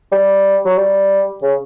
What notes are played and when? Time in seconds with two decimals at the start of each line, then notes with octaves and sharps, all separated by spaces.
0.12 G3
0.65 F#3
0.77 G3
1.42 C#3